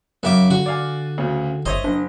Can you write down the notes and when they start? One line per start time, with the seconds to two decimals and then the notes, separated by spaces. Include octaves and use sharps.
0.23 F#2 C#3 E5 D6
0.51 D3 F#4
0.66 D5 F5 G#5
1.18 D2 C#3
1.66 G1 C5 C#5 D#5 E5
1.84 F#1 D4